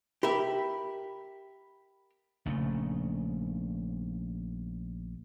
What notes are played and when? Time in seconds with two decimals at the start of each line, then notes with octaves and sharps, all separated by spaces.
0.23 G4 A#4 E5 B5
2.46 A#1 C#3 A3